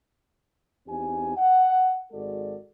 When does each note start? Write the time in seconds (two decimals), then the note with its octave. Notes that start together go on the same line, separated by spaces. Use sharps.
0.87 E2 C4 D#4 G4 G#5
1.37 F#5
2.12 G#1 G#3 F#4 A4 D5